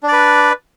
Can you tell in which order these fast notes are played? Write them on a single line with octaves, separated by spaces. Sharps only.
D4 D5 B4